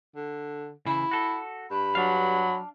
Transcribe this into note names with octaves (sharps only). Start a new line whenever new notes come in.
D3
C#3 E3 E4
F#4 A4
G2 B5
F#3 D4 F5